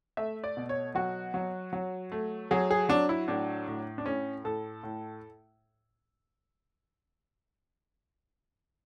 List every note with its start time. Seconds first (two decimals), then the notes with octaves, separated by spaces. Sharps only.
0.17 A3 E5
0.44 D5
0.57 B2
0.69 C#5
0.95 F#3 F#4
1.34 F#3
1.73 F#3
2.12 A3
2.51 F#3 G#4
2.71 G#4
2.89 F#3 D4
3.09 E4
3.28 A2 D4
3.68 A2
3.98 D4
4.06 A2 C#4
4.44 A2 A4
4.83 A2